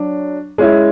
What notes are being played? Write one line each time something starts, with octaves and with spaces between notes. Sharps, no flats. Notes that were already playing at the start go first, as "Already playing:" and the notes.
Already playing: F#3 D4
G#3 C#4 E4